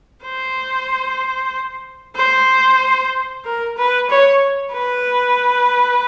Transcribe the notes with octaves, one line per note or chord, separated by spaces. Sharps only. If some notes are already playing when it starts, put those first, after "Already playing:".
C5
C5
A#4
B4
C#5
B4